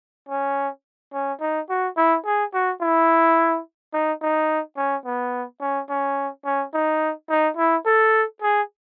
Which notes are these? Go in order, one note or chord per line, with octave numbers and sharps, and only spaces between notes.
C#4
C#4
D#4
F#4
E4
G#4
F#4
E4
D#4
D#4
C#4
B3
C#4
C#4
C#4
D#4
D#4
E4
A4
G#4